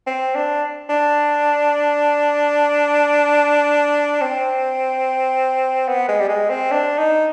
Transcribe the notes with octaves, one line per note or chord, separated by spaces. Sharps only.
C4
D4
D4
C4
B3
G#3
G3
G#3
C4
D4
D#4